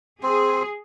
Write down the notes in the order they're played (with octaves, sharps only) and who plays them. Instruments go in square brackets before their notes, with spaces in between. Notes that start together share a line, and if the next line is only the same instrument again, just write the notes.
[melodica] C4 [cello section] G#4